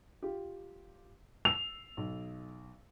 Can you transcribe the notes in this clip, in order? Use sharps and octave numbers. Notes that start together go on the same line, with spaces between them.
F4 G4
E6 C7 E7 F7
B1